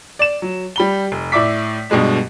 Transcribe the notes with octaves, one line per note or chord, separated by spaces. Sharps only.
D5 E7
F#3
G3 B5 G7
F1
A2 D5 E5 D6 B6
G2 B2 G3 G#3 D4